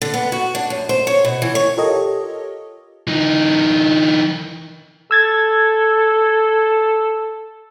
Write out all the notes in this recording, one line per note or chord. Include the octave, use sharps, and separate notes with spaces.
D3
B3
F#4
D4
F#2
C5
C#5
B2
E3
C#5
F4 G4 A4 A#4 C#5 D#5
E3 D#4
A4 E6 G#6 A6